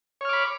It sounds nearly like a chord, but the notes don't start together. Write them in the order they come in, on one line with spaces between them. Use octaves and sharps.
C#5 F6 D6 B5